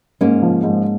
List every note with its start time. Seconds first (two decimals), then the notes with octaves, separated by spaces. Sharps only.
0.21 G#2 A#3 C#4
0.42 F3
0.64 G#2